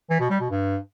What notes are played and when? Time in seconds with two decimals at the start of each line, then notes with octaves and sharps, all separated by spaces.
0.10 E3
0.20 B2
0.30 G3
0.40 B2
0.50 G2